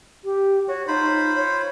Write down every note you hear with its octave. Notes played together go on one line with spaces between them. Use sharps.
G4
F#4 C#5
D#4 F4 C5 B5
C#5